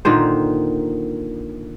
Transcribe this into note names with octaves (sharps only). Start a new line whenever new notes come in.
A#2 D3 D#3 C5